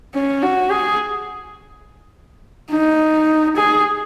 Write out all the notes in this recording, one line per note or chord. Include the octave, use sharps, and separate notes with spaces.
C#4
F#4
G#4
D#4
G#4